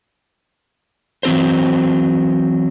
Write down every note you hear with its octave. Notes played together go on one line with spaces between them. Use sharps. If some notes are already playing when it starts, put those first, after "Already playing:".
E3 F#3 C4 A#4 C5